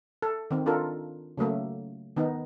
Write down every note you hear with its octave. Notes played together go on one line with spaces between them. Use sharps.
A4
D#3 C4
D4 F4 A4 A#4
C#3 F#3 A3 A#3
D#3 B3 D#4